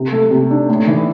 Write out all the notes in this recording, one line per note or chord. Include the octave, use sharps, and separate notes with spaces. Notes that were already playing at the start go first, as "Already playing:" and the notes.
Already playing: C3
A3
C3
D4
A2
E3